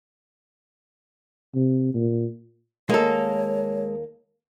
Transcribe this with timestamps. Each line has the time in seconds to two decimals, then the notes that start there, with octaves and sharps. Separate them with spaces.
1.55 C3
1.94 A#2
2.90 D#2 G#3 A#3 A4 C#5